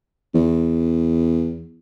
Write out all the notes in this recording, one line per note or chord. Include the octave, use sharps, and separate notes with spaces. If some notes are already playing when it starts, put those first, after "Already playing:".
E2